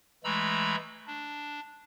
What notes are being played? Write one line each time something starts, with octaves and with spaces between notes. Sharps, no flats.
E3 G#3 A3 A#5 B5 E6
D4